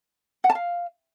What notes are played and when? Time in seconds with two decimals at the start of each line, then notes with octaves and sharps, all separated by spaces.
0.44 F#5
0.50 A5
0.55 F5